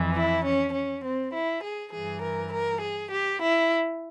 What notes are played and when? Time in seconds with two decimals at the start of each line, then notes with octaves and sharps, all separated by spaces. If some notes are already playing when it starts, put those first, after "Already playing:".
Already playing: F2 E3
0.14 E4
0.43 C#4
0.73 C#4
1.03 C4
1.33 E4
1.62 G#4
1.92 G2 E3 G#4
2.22 A#4
2.51 A#4
2.81 G#4
3.10 G4
3.41 E4